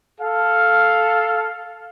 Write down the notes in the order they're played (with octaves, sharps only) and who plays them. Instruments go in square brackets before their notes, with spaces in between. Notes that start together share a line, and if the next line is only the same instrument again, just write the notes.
[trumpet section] A4 F5